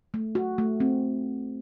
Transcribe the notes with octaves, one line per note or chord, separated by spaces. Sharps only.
A3
F#4
A3
C4